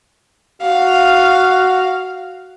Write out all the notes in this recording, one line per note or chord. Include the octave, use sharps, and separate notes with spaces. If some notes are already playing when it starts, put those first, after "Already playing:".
F#4 F5